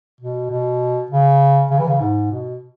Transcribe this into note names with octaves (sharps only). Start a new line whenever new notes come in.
B2
B2
C#3
C#3
E3
C#3
G#2
B2